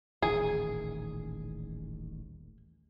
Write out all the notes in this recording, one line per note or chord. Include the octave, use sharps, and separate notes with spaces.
D#1 A1 D#3 G#4